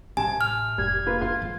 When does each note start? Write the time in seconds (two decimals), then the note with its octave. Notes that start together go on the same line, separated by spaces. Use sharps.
0.17 A1 C3 G#5 A5
0.41 F6
0.78 F1 G3 G#6
1.06 A#3 F4 B4
1.21 G#2 F4 C6
1.42 F3